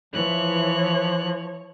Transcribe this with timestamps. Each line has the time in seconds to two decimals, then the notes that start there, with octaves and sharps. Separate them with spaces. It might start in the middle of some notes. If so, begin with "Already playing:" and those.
0.14 E3 F3 C#5 F#6